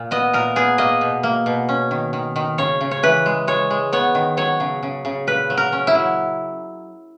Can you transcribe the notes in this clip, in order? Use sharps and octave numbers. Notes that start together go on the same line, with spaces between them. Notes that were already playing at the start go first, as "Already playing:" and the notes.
Already playing: A#2
B3 D#5
A#2 A#4
B3 G#4
A#3 D#5
B2
A#3
B2
C#4
D#3
D#3
D#3
C#3 C#5
C#3
C#5
E3 B4
G#3
G#3 C#5
G#3
B3 C#5
D#3
F#3 C#5
C#3
C#3
C#3
A#2 B4
F#3
A#4
C#4
E4
F#3